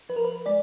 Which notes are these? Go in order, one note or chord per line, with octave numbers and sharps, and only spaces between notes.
F3 B4
A#4
B4
G#3 D5